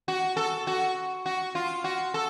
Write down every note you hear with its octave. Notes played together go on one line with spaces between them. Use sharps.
F#4
A4
F#4
F#4
F4
F#4
A4